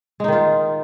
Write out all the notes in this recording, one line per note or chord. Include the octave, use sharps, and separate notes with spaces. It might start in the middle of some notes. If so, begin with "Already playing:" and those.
D#3 G#3 D#4 F4